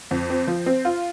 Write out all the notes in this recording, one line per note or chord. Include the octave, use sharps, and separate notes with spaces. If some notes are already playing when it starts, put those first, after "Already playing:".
F2
C4
F3
C4
F4